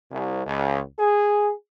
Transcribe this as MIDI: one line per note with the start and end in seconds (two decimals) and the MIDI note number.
0.11 0.41 36
0.46 0.80 37
0.99 1.52 68